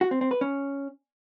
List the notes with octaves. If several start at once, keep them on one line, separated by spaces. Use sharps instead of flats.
F#4
C4
C4
B4
C#4